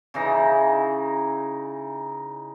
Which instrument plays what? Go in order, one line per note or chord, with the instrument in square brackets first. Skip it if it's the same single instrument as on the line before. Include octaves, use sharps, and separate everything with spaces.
[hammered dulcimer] C#3 E3 D#4 A#5